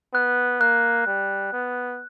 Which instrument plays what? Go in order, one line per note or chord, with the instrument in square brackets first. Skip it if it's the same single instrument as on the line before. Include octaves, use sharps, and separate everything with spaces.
[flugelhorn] B3 [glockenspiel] F#6
[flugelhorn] A#3 [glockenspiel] F#6
[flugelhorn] G3
B3